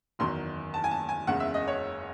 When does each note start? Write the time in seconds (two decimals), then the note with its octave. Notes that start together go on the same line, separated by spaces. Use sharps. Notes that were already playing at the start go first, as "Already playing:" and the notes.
0.19 F#1 E2 D#3 F#3 C6
0.74 A5
0.84 G#5
0.91 A5
1.09 G#5
1.27 F#1 E2 C#3 G#3 F#5
1.40 E5
1.54 D#5
1.68 C#5